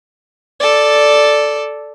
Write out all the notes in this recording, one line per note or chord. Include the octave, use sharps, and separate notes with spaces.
A4 D5